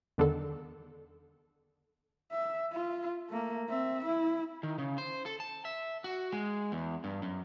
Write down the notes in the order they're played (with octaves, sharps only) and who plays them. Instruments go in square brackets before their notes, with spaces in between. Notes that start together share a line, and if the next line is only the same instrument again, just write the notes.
[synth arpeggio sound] E2 D3 D#3 A4
[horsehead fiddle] E5
F4
A3 A#3
C4 E5
E4
[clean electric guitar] D#3
C#3
C5
A4
A5
E5
F#4
G#3
E2
G2
F#2